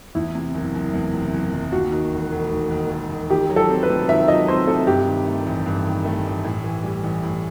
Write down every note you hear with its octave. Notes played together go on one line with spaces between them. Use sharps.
E2 E4
C3
F#1
F#1
E2
C3
F#1
F#1
D#2 F#4
D#3
E1
E1
D#2
D#3
E1
E1
D#3 G4
F#3
A4
C4
B4
C3
D#3 E5
F#3 D#5
C4 C5
C3 A4
G2 G4
D#3
A3
A1
G2
D#3
A3
A1
A2
E3
G3
A1
A2